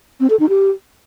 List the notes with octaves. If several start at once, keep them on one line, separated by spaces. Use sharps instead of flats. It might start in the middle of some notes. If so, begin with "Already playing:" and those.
C4
A4
D#4
G4